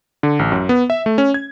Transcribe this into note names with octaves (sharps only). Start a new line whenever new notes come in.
D3
A1
F#2
B3
E5
A3
C#4
G#6